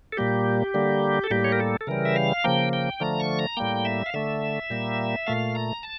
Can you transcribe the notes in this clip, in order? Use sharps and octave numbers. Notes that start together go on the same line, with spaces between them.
A4
A#2 G3 A#3 G4
D3 G3 A#3
A4
A2 G3 A#3 G4
C#5
A#4
A4
A4
C#3 E3 G3 A#4
E5
F5
C#3 F3 A#3 G5
G5
D3 F3 A3 A#5
C#6
A#5
A2 G3 A#3 G5
E5
F5
D3 A3 E5
A#2 G3 A#3
A#2 A3 F5
A#5
A5